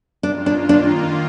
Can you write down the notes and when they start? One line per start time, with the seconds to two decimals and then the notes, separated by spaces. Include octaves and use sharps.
0.23 D#3 A#3 D4 F4
0.46 D4
0.69 D4